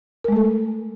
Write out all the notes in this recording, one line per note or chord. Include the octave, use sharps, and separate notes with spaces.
G#3 A3 A4 A#4